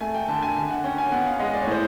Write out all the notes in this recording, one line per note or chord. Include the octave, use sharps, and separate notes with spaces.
A3 G#5
G5
D3 A5
G#5
D3
F#5
C#4 G5
G#5
B3 F#5
F5
G#3 D#5
D5
C#5
A2 C5